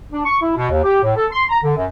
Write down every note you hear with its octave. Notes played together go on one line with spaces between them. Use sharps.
D4
C#6
E4
B2
D#2
G4
A2
A4
C6
A#5
D3
F#2